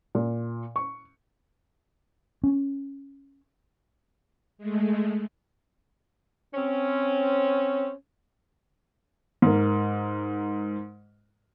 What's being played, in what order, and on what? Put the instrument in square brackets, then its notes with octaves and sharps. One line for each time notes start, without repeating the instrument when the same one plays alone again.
[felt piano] A#2
C#6
[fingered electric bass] C#4
[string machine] G#3 A3
[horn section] C4 C#4
[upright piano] G#2 A#4